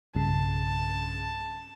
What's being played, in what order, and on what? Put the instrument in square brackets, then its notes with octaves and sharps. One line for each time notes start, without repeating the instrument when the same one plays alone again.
[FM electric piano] B1 G2 C#3 [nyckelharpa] A5